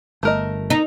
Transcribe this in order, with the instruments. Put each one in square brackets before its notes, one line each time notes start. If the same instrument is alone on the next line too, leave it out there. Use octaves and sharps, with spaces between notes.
[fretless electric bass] G1 [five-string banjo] A3 A#4 D#5
[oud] D#4